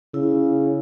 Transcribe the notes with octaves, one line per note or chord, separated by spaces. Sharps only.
C#3 E4